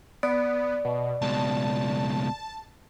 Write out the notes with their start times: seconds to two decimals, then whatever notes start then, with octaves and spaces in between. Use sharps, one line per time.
0.23 B3 D5
0.85 B2
1.22 C#2 B2 A5